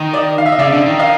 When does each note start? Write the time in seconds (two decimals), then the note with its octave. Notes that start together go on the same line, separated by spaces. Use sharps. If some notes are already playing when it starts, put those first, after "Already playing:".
Already playing: D#3
0.13 D5
0.17 D#5
0.38 F5
0.46 E5
0.52 D#5
0.58 C#3 D5 E5
0.72 D3
0.86 D#3
0.99 D#5 F5